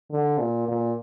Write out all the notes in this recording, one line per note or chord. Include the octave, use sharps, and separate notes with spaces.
D3
A#2
A#2